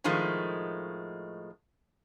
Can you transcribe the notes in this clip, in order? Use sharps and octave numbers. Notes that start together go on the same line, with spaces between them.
A2 D#3 F3 G#3 A3